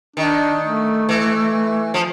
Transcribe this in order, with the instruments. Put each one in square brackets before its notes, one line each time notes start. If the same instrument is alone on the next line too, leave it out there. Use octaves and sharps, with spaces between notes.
[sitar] D#3 [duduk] D4
[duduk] A3
[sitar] E3
F3